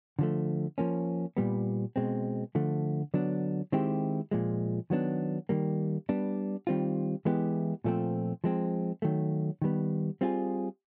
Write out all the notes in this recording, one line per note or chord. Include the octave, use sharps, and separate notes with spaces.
D3 F3 A3
F3 A#3 C#4
A#2 G3 B3
B2 G#3 C4
D3 F3 A3
D3 F#3 B3 D4
D#3 G#3 C4 E4 G4
A#2 F3 G#3
D#3 F#3 B3 D4
D#3 G3 A#3
G3 B3 D4
D#3 G3 C4 F4
E3 G#3 B3 E4 G4
A#2 F3 A3 C4
F3 G#3 C4
D#3 F#3 A3
D#3 G3 B3
G3 C4 F4 G#4